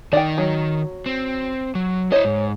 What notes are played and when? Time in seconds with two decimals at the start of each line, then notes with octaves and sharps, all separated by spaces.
0.13 D#3 D#4 D5 G5
0.38 F#3
1.06 C4
1.75 F#3
2.12 E4 C5 C#5 D#5
2.25 G#2